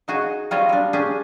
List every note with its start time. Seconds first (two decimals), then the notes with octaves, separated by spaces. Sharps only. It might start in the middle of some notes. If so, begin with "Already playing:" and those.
0.08 D#4 F#4 G#4
0.51 F#3 G3 C4 F4 C#5 D#5
0.69 G3 D4
0.93 C#4 D4 G4 G#4